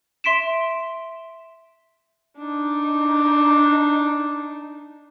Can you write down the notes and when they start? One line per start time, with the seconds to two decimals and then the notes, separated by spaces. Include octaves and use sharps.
0.24 E5 C6 B6 D7 E7
2.38 D4 D#4